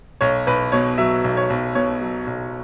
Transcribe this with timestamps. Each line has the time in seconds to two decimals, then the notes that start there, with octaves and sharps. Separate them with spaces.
0.21 B1 C#5
0.47 B1 B4
0.72 B2 C#5
0.98 F#3 E5
1.24 B1
1.37 C#5
1.50 B1
1.75 B2 C#5
2.01 F#3
2.27 B1